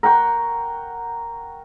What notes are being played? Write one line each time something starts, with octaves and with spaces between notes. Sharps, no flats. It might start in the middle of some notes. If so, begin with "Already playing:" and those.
A#4 F#5 G5 C#6